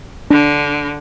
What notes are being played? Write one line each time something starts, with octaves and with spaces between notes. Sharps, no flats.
D3 D4